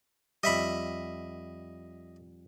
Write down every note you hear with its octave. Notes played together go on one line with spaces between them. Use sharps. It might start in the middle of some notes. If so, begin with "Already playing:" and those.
F2 G3 D#5 E5 B5